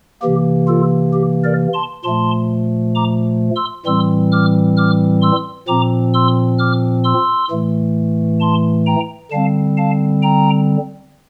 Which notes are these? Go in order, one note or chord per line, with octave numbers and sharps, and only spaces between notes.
C3 E3 A#3 G4
F4 A4
G4
A#4 D5
A5 C6
A#2 F3 A3 A5 C6
A#5 D6
C6 E6
A2 E3 G3 C4 C6 E6
D6 F6
D6 F6
C6 E6
A#2 F3 C4 A#5 D6
C6 E6
D6 F6
C6 E6
A2 E3 A3
A5 C6
G5 A#5
D3 G3 C4 F5 A5
F5 A5
G5 A#5